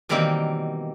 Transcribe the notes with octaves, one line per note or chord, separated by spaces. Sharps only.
B2 D#3 E3 G3 A#3 C4